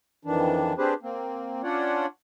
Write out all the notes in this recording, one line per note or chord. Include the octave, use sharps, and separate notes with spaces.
F2 D#3 E3 D4
C4 D4 G4 G#4 B4 C5
A#3 C4
C#4 D4 F4 C#5 D5 F#5